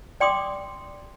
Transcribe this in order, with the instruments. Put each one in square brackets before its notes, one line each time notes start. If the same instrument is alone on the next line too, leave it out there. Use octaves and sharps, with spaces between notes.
[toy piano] D5 G5 C6 D6 D#6